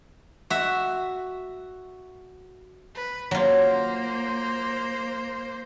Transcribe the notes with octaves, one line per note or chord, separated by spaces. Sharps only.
F#4 E5
B4
F#3 A#3 F4 C5